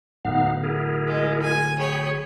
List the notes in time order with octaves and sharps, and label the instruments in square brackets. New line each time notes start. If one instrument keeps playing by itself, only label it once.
[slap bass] D1 [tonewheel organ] B3 D#4 F5 [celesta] F#5
[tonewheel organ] E4 G#4 A#4
[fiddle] G#3
G#5
[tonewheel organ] G#4 G5 B5 [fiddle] C#5